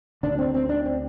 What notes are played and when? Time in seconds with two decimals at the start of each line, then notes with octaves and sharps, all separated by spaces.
0.23 D2 D3 D4
0.39 C4
0.54 C4
0.69 D4
0.86 C4